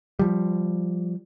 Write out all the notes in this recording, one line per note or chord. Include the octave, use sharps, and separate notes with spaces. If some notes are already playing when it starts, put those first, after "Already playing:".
F3 G3